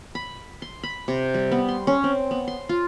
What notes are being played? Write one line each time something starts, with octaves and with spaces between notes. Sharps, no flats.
B5
C6
B5
C3
G3
B3
C6
C#4
C4
B3
C6
F4